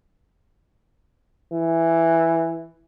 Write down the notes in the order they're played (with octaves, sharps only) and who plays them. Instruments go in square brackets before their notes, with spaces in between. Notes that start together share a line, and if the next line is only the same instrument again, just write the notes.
[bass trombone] E3